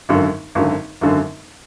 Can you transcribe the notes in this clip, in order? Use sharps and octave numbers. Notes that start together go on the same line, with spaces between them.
G#1 F#2 D3
G#1 F#2 D3
G#1 F#2 D3